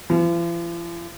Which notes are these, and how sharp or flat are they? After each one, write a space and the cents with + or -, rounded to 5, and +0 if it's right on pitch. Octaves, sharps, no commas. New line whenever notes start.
F3 -45